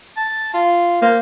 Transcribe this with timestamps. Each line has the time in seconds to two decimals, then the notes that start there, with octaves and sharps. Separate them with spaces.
0.17 A5
0.54 F4
1.02 A#3 C5